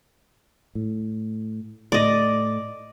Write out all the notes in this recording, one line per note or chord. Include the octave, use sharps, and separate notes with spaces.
A2
A2 A3 D5 D#5